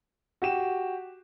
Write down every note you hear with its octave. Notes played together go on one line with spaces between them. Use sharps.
F#4 G4 E7